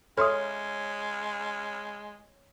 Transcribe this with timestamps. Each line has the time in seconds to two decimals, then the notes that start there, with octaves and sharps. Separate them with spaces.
0.18 G#3 A4 C#5 E5 C6 D#6 F6